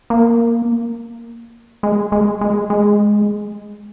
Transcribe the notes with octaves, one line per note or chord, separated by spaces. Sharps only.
A#3
G#3
G#3
G#3
G#3